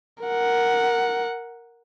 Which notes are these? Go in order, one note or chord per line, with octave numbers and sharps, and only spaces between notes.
A#4 F#5